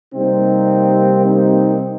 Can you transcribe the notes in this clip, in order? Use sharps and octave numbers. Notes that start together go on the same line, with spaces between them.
C3 G3 A#3 C4 D#4
C4 D#4